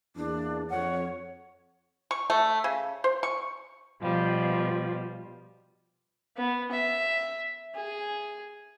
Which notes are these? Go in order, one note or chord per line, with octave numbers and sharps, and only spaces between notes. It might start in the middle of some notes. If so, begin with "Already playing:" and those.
E2 A#3 D4
F2 C#5 F#5
C#6
A3
C#3
C5
C#6
B2 F3 G3
B3
E5
G#4